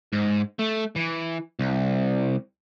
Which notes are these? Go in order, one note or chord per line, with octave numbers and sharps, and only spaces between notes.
G#2
A3
E3
C2